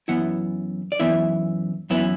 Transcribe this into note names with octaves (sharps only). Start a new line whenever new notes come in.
F#2 E3 B3 E4 F#5
D5
F#2 E3 B3 E4 E5
F#2 E3 B3 E4